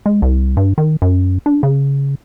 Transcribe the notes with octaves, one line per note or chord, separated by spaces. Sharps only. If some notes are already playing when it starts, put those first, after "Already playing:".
G#3
C2
G2
D#3
F#2
D4
C#3